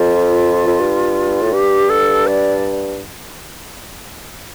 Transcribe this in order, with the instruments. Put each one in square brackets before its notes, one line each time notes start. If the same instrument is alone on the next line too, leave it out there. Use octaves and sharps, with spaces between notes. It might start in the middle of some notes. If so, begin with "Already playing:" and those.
Already playing: [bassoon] F2 [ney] F4
[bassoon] F2
G2
A2
[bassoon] G2 [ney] G4
[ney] A4
D5